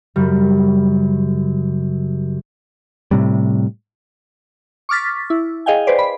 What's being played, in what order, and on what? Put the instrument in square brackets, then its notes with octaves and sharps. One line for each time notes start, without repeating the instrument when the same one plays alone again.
[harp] F#2 C#3 G3
[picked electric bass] A2 C3 G3
[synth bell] C#6 D6 F6 A6 B6
E4
G#4 D#5 F5 G5 G#5
B4 C5 D5
B5